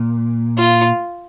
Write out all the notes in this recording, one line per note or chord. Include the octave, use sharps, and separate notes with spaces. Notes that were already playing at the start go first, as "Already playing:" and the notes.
Already playing: A#2
F4